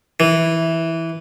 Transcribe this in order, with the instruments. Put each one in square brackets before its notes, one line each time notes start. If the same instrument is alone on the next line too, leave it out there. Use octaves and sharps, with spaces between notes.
[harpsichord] E3